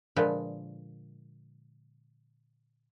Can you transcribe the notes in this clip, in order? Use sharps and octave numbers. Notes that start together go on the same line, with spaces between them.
A#2 D3 F3 G#3 B4 G5